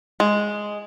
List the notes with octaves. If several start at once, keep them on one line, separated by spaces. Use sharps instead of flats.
G#3